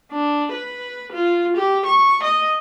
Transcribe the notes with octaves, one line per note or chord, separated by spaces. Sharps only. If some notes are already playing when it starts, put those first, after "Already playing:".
D4
B4
F4
G4
C#6
D#5